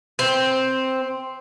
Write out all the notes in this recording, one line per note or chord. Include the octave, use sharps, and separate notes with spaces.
C4